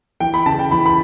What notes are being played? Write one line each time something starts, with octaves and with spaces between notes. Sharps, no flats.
E3 G5
B5
C#3 A5
G5
E3 B5
B5